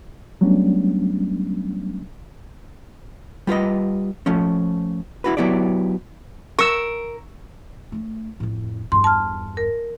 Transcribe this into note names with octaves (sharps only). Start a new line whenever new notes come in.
F#3 G3 A3 B3 C#4 D4
G3 F4 B4 D#5
F3 A3 C#4
E4 F#4 B4
F#3 B3 E4 G4 D5
A#4 C#6 E6
A3 D4
F2 A2
E2 G2 C6
A5 F6
A#4